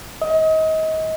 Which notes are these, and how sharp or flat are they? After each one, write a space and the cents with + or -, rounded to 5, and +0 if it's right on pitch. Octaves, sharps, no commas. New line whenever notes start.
D#5 +30